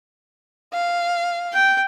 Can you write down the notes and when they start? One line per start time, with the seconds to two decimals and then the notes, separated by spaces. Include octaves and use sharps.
0.74 F5
1.53 G5